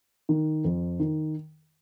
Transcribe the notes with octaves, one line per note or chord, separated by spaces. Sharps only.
D#3
F2
D#3